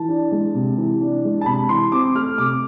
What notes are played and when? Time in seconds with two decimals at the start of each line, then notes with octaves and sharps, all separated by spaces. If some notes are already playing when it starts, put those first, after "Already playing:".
Already playing: E3 A5
0.09 D4
0.31 G#3
0.54 C3
0.78 E3
1.01 D4
1.24 G#3
1.41 A5
1.46 C3 B5
1.69 E3 C6
1.92 C4 D6
2.15 A3 F6
2.38 C3 D6